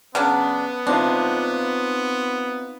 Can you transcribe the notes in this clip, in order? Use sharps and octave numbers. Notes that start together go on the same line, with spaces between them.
C#3 F#3 B3 D4
C4 D4 D#4 F4